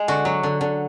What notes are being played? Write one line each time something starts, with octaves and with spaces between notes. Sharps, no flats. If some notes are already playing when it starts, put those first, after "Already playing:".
Already playing: G#3 G#4
D3 F#4
F#3
D3
D3